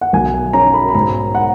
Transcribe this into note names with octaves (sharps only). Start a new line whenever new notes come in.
F#5
B1 G#5
G#5
C#4 A#5
B5
B5
G#2 A#5
F#5